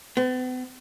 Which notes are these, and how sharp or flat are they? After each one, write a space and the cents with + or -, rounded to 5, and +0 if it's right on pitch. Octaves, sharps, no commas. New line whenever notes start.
B3 +45